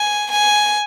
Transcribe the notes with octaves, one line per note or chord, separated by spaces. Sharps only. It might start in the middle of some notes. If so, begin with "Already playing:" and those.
Already playing: G#5
G#5